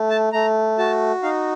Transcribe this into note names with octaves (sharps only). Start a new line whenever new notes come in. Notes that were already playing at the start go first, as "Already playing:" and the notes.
Already playing: A3
A5
A3 A#5
F#4 A5
D#4 F5